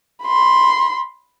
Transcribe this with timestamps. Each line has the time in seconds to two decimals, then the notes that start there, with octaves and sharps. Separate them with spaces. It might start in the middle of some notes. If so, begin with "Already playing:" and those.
0.24 B5 C6